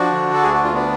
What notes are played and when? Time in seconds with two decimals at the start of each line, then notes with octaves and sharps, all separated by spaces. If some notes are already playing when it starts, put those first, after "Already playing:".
Already playing: F3 D4 F#4
0.12 D3
0.33 A4
0.43 D2 G#4
0.54 F#4
0.63 F4
0.74 B3 D4